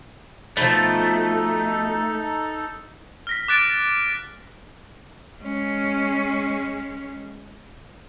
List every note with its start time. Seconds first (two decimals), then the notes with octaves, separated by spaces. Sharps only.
0.57 B2 F3 A3 D#4 A4
3.27 F6 A#6 B6
3.48 D6 F#6 A6 D7
5.41 G#3 C#4